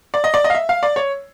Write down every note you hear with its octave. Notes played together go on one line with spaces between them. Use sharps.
D5
D#5
D5
D#5
F5
E5
F5
D5
C#5